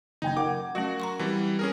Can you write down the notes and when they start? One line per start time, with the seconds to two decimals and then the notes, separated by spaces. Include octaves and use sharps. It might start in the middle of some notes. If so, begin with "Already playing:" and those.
0.22 F#1 D#4 G5 G#6
0.37 A#4 F#5 D6
0.75 F#3 A3 C#4 F#4
1.00 A#5 C6 C#6
1.19 E3 G3 C4
1.59 C#4 G#4 A#4